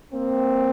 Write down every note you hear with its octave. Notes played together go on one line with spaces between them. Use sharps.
A#3 C4